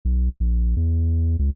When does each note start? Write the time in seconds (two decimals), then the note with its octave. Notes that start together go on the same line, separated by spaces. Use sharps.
0.05 B1
0.40 A#1
0.76 E2
1.39 C#2